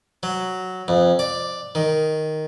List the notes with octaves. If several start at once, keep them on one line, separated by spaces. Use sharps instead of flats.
F#3
F2
D5
D#3